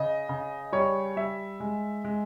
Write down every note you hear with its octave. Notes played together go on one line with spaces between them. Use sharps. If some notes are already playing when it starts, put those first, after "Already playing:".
Already playing: C#3 D#5
C#3
G3 C#5
G3 E5
G#3
G#3